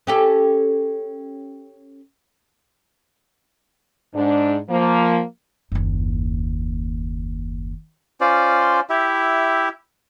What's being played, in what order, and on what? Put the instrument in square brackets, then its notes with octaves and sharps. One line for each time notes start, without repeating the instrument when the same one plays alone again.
[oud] C#4 G4 A4
[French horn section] G#2 D4
F3 A#3
[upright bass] F#1 D#2
[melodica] C#4 F4 C5 D5
E4 G4 E5